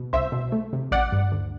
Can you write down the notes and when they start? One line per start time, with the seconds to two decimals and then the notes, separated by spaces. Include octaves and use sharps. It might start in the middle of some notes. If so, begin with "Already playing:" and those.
Already playing: B2
0.13 C2 C5 E5
0.32 B2
0.52 A3
0.73 C3
0.92 A1 D5 F#5
1.12 G2
1.32 D2